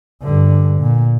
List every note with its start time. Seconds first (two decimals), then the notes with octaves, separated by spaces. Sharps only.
0.23 G2 D3
0.80 A#2